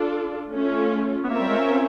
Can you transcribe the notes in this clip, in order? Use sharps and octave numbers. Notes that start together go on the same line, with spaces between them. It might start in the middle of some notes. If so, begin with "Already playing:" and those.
Already playing: D4 F4 A4
A3 C#4 F4
B3
A#3 C4 F4 A#4 C#5 E5
G3
G#3
C#4